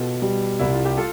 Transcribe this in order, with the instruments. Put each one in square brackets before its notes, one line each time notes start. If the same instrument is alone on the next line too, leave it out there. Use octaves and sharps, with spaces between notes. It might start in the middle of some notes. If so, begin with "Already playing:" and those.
Already playing: [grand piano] B2 [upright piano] F4 G4 A4
[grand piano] G3
[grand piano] C2 [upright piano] E4
[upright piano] F4
G4
F4 A4